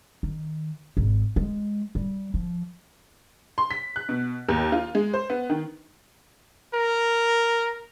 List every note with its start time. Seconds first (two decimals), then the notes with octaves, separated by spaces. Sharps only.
0.23 D#3
0.97 G#1
1.36 G#3
1.95 G3
2.34 F3
3.58 C6
3.71 B6
3.96 F#6
4.09 B2
4.49 D#2
4.72 F4
4.95 G#3
5.14 C5
5.30 B3
5.50 D#3
6.74 A#4